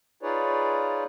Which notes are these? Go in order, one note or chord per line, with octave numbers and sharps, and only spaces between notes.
D#4 F4 G#4 B4 C#5 D5